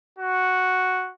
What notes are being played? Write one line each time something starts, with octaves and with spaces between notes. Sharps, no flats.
F#4